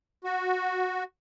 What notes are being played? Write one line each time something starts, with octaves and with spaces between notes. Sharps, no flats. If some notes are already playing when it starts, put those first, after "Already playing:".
F#4